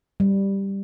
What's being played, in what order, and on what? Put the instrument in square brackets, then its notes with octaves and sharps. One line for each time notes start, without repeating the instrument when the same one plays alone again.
[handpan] G3